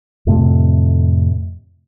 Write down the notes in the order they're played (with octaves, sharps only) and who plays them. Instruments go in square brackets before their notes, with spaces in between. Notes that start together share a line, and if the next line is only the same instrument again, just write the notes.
[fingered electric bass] F2 A2 C3 A3